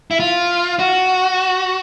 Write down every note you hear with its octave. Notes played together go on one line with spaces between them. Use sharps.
E4
F4
F#4